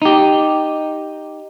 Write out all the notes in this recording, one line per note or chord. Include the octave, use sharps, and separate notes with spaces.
D#4 G4